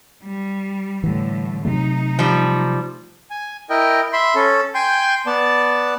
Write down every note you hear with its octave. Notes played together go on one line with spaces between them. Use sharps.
G3
A2 D3 E3 G3
C3 F#3 A3 D#4
F3 G3
G#5
E4 A#4 D#5 G5
E5 B5 C6
C#4 A4
G5 G#5 C6 G6
B3 D5 A5